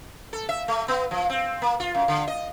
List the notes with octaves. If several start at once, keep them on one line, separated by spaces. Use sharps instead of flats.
A4
E5
A3
B3
F3
C4
A#3
F4
F#2
D3
D#5